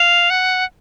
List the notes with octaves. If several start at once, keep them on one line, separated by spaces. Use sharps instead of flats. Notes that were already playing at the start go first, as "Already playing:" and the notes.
Already playing: F5
F#5